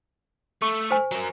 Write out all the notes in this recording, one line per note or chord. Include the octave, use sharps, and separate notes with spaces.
A3 C#6
C5 G#5
F#3 A#4